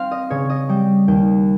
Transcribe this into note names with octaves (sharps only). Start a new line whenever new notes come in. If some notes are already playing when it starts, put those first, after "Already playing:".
Already playing: C4 F5
D#5
C#3 C#5
D#5
G3 G5
D#2 G5